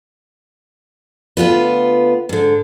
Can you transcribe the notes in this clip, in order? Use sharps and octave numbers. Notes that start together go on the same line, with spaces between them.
D2 B3 F4 B4
G#2 D3